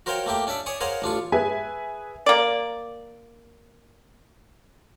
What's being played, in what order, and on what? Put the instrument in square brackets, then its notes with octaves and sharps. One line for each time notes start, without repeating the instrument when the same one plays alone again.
[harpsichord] F#4 A#4 C5 C#5 F5 G5
A3 A#3 G4 G5
C#4 D4 D5 E5
C#5 D5 G#5 C#6 D#6
G#4 A#4 C5 C#5 F5 F#5
A1 D4 F4 C#6
[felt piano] G#4 B4 E5 G#5
[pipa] A#3 D5